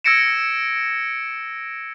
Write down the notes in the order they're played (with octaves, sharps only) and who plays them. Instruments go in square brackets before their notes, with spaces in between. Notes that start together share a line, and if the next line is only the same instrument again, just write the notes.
[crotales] E6 G#6 A#6 C#7 D7 E7